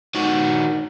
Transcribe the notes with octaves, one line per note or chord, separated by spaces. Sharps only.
D#3 F#4